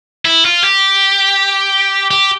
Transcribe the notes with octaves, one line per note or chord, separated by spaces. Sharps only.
E4
F4
G4
G4